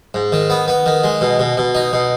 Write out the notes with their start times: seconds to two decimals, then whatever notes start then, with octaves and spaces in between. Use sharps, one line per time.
0.14 G#2
0.32 D#3
0.50 B3
0.68 B3
0.86 D#3
1.04 G#3
1.21 B2
1.39 B2
1.57 B2
1.75 D#4
1.93 B2